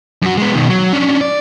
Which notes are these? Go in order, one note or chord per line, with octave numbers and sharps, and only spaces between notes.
F#2 F#4
G#3 B3
B2 D#3
F#3
C#4 D4
D5